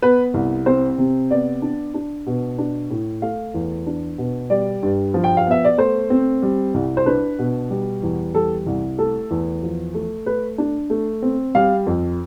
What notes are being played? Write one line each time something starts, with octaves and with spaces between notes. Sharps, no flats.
B3 B4
C2
C4 C5
C3
B3 D5
D4
D4
B2
D4
A2
A3 F5
E2
D4
B2
G3 D5
G2
F3
G5
F5
B3 E5
D5
A3 C5
C4
G3
C2
C5
D4 B4
B2
G3
E2
G3 A4
C2
A3 A4
E2
F3
A3
A3 B4
D4
A3
C4
G3 F5
F2